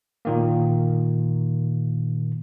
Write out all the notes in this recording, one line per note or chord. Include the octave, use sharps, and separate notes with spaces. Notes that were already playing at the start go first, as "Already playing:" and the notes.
A#2 D#3 A#3